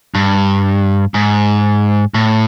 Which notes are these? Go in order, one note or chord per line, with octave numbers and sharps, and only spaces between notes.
G2
G#2
A2